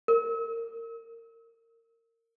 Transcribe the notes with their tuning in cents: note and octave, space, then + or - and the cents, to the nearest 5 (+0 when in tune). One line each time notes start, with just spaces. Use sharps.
A#4 -25